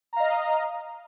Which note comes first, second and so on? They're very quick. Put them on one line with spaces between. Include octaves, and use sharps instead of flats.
A#5 F5 D#5